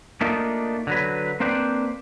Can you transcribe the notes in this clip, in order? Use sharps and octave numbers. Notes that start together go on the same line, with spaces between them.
A3 A#3 D4 D#4 F4
D3 F#3 B4
A#3 C4 D4 B4 C5 D5